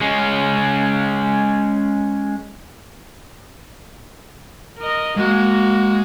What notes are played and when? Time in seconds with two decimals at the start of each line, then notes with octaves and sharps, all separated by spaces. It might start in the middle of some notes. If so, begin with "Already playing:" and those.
0.01 G#3 C#4
4.79 A#4 D#5
5.17 G#3 A#3 F#4 D#5